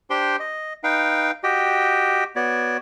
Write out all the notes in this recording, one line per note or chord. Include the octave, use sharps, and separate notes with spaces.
D4 G4 C5 G5 C6
D#5
D#4 B4 F5 G5
F#4 G4 D#5 G5
B3 F#4 C#5 D5